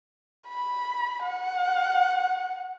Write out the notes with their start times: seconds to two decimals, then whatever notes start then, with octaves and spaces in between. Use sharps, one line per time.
0.49 B5
1.25 F#5